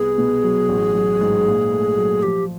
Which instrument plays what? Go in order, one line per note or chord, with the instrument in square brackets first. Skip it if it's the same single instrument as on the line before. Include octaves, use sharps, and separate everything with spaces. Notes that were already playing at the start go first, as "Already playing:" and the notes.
Already playing: [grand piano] C2 B3 [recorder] G#4
[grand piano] B2
F#3
A1
F#3
G#2
A#2
A3
F#3
[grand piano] F3 [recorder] G4